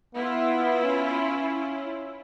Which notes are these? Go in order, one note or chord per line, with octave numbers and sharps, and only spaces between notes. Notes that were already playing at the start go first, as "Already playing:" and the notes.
B3 E4 F4
C#4